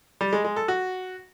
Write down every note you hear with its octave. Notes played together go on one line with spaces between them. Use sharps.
G3
G#3
G#3
A4
F#4